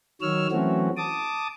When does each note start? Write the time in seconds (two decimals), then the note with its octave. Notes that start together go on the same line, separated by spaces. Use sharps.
0.21 D#3 F#3 C#5 E6 F6
0.52 E3 F#3 A3 C4 C#4 F#4
0.97 A5 D6 D#6